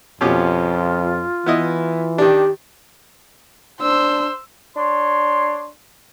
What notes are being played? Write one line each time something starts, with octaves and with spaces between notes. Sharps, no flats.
F2 B2 C#4 F4 G4
E3 B3 E4 D#5
D#3 D4 G4
D4 C5 E6
D4 C#5 C6